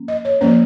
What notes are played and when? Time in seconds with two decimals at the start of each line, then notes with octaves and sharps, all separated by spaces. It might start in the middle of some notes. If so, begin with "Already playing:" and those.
Already playing: F3 A#3 C#4
0.08 D#5
0.25 C#5
0.41 F3 A#3 C#4 C5